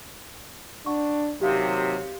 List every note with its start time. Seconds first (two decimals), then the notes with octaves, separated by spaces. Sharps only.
0.86 D4 F#5 C#6
1.41 D#2 C3 F#3 G4 F5 C6